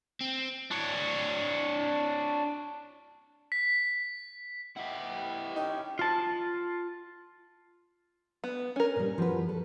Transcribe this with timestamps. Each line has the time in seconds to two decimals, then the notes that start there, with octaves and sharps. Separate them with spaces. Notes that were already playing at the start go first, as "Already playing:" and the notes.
0.21 C4
0.71 D4 C#5
3.52 B6
4.77 E4 G4 D#5 F#5
5.56 C#4 D#4 G5
5.99 F4 A5
8.44 B3
8.76 C#4 A#4
8.96 A#2 G3
9.18 F3 F#4 B4
9.49 A4